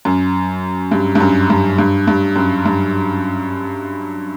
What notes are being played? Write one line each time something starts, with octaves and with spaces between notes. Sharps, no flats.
F#2
G2
G2
F#2
G2
G2
G2
F#2
G2